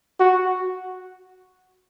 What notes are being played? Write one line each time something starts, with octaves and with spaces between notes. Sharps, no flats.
F#4